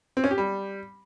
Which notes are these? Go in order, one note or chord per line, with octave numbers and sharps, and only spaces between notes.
C4
C#4
G4
G3